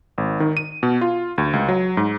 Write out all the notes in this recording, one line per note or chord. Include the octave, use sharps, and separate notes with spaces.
G#1
D#3
D#7
B2
F4
D2
C#2
F#3
G#2